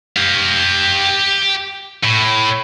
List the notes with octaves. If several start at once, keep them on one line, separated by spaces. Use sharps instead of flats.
G4 F5
A2